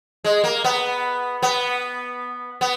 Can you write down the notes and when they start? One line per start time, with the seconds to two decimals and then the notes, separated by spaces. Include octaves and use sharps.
0.24 G#3
0.44 A#3
0.64 B3
1.42 B3
2.61 B3